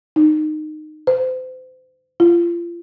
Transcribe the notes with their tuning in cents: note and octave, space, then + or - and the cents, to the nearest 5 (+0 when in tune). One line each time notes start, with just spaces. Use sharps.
D#4 -20
C5 -35
F4 -30